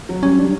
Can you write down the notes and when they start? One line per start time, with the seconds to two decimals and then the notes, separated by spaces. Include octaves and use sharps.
0.09 F#3
0.23 G3 C#4
0.33 F#3
0.39 G3 D4